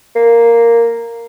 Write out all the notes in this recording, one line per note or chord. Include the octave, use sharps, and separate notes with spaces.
A#3